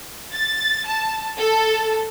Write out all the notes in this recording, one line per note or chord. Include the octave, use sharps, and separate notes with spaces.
A6
A5
A4